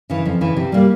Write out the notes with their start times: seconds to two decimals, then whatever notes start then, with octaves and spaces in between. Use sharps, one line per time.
0.10 C#3 E3
0.25 F2
0.41 C#3 E3
0.57 C3
0.72 G3 A#3